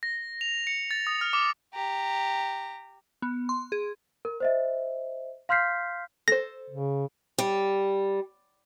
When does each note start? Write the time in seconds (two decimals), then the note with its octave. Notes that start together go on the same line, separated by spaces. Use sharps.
0.03 A#6
0.41 F7
0.67 C#7
0.91 A6
1.07 D#6
1.21 F6
1.33 D6
1.74 G4 A#5
3.22 B3
3.49 C6
3.72 G#4
4.25 A#4
4.40 C5 D#5 E5
5.49 F5 C6 F6 G6 B6 C7
6.28 A4 C5 A#6
6.70 C#3
7.38 G3